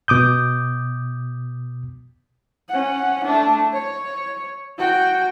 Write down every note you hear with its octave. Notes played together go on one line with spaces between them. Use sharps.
B2 D6 D#6 G6
C#4 F#5
A3 D4
C#5
F#4 G5